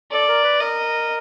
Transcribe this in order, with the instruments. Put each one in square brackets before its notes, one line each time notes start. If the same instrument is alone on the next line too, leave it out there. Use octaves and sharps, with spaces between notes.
[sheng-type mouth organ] A4 [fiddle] D5
[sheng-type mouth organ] A#4
B4
[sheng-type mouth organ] A#4 [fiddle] D#5